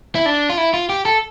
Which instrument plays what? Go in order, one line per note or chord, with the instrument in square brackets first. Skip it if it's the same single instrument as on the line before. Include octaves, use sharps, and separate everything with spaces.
[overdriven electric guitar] E4
D4
F4
E4
F4
G4
A4